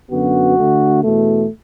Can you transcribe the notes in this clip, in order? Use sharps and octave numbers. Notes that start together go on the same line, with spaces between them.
F#2 D3 B3 F#4
D2 D3 A3
E2 B2 A3